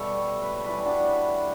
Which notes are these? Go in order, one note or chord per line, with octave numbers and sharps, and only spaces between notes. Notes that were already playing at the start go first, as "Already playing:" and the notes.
Already playing: B2 G3 A3 A4 C#5
B4
C#5
A2 E3 G3 B4 D5
D4 F#4